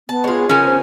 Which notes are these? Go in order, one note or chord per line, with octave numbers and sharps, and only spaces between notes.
B3 A5
G#3 F4 G#4 C#5
C#3 C#4 A#4 G#5
C5